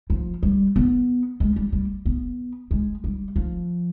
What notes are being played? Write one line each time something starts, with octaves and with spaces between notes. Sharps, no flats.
F3
G3
B3
G#3
G3
G3
B3
G#3
G3
F3